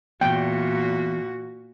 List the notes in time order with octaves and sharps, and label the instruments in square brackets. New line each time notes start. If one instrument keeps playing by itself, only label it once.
[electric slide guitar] E2 [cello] A#2 F#4 [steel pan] G5